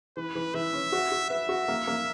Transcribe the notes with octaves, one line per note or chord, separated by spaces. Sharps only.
E3 B4
E3
E3 E5
C#4
F#4
F#4
B4 E5
F#4
A#3
A#3